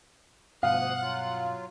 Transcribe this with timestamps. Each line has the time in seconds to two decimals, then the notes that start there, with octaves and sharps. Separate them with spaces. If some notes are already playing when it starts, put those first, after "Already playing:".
0.63 D2 G2 B2 F3 F5 F#5 D#6 F#6
1.01 F#3 F4